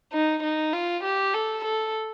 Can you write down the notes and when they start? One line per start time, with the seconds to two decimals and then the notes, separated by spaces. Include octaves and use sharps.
0.13 D#4
0.43 D#4
0.73 F4
1.04 G4
1.34 A4
1.65 A4